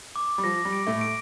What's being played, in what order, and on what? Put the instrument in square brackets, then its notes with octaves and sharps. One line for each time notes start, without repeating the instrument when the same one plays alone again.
[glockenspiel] D6
[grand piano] G3
[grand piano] F3 [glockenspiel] A#6
[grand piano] G3
[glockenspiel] D7
[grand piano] A2 A3
[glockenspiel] D7